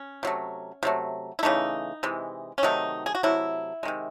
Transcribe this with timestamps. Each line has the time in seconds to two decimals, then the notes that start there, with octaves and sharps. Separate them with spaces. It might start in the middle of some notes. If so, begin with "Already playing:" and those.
Already playing: C#4
0.23 C3 F#3 A3
0.83 C3 F#3 A3
1.39 E4
1.43 C#3 E3 A3 D#4
2.03 C3 E3 G#3
2.58 C#4
2.63 C3 D#3 F#3 A3 D#4
3.06 G#4
3.15 F#4
3.23 C3 F#3 A3 E4
3.83 C3 D#3 G#3